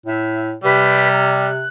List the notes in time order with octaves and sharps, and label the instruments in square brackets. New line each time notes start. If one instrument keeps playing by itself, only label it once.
[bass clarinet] A2 [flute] E5
[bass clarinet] C3 [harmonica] G3 [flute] B4
[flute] A#5
F#6